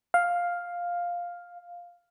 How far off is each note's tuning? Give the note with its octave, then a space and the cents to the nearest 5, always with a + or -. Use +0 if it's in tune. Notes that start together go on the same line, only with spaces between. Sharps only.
F5 +5